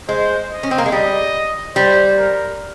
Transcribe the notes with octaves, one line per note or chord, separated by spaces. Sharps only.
G#3 C5
D#5
C#4
C4
A#3
G#3
G3 D#5
G3 C5
A#4